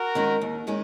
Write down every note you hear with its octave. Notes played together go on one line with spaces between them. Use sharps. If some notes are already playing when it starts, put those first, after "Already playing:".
Already playing: F#4 A#4
D#3 G#3 C#4
D#2
D#3 G#3 C#4